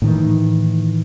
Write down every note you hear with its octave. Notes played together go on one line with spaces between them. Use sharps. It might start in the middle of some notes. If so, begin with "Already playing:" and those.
A2 D#3 E3